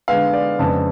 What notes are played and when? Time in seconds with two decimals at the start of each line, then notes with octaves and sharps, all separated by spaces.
0.08 D3 G#3 B3 F5
0.33 D5
0.59 F2 C#3 G#3 B3 D4 A5